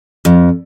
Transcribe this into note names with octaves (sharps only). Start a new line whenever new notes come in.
F2